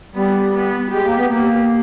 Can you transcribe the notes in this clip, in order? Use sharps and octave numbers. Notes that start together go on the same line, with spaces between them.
G3 B3
B3
G#3 G4
A#3
B3
A#3 G4